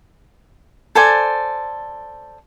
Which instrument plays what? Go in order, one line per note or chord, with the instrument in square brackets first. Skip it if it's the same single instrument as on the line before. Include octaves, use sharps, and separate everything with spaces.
[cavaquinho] A4 C5 D5 G#5